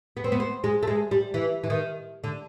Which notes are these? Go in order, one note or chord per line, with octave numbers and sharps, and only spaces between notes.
B3
C4
B3
C4
G#3
A3
G#3
G3
E3
E3
D#3
D3